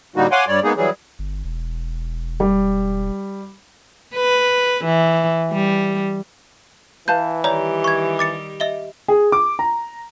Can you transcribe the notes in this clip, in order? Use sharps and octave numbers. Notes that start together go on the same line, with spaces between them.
A2 D3 G3 A#3 D#4 F#4
C#5 F5 F#5 G#5 C6 D6
G2 G3 C#5 D5
G#3 A#3 B3 D#4 G#4
E3 F#3 G3 G#4
G1
E1
G3
B4
E3
G3
E3 B4 F5 A5 G6
D#3 G3 G4 C#5 D5 A#5
C#6 G#6
D6 A6 C#7
D#5 E5 G7
G#4
D6
A#5